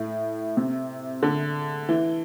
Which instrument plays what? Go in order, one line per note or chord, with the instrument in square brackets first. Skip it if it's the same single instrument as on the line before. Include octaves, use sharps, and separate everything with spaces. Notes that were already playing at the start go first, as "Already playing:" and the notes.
Already playing: [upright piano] A2
C3
D3
E3